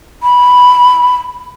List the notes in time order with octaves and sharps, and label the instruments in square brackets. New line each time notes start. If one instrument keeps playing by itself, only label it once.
[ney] B5